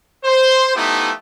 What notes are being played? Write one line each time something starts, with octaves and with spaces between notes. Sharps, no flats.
C5
F3 A3 B3 D#4 E4 G4